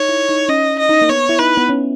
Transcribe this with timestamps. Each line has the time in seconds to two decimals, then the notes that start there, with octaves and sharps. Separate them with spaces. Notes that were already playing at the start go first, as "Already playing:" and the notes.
Already playing: D#4 C#5
0.09 E4
0.29 D#4
0.49 C#4 D#5
0.79 D#5
0.89 D#4
1.02 A#3
1.09 B3 C#5
1.29 E4
1.39 D#4 B4
1.57 B3
1.69 C#4